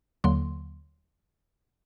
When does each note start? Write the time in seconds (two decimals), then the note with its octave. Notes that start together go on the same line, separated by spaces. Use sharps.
0.24 D#2 D3 F#3 A#3 C6